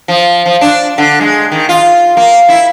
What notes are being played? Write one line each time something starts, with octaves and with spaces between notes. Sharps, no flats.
F3
F3
D4
D3
G#3
D#3
F4
A#3
E4